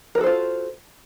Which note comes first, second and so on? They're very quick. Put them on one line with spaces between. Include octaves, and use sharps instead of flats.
A#4 F#4 A4 C5 F4